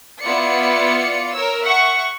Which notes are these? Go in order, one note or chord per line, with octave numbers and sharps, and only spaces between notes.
B3 E4 F4 D5 C#7
A#4 C#5 E6
E5 F#5 C#6